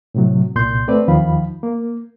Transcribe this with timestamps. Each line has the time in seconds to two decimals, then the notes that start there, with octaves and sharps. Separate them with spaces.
0.15 A2 C3 F#3
0.55 C2 A#2 C6 G6
0.88 A3 C4 B4 D5
1.08 D#2 D#3 F3 F5 B5
1.63 A#3